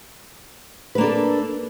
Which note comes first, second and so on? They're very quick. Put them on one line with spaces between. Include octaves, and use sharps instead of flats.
B4 A#3 D4 A4